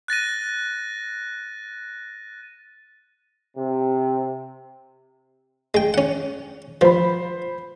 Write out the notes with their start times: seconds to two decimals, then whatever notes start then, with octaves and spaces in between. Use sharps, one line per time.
0.08 F#6 A6 A#6 D#7
3.56 C3
5.74 G#3 G5
5.94 C#4 F#5
6.81 F3 C5 B5